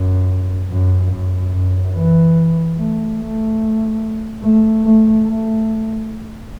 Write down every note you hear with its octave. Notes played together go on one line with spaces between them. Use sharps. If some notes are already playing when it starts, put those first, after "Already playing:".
Already playing: F#2
F#2
F#2
F#2
E3
A3
A3
A3
A3
A3